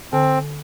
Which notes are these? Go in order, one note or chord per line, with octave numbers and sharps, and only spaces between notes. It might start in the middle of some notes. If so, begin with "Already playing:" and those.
D3 C4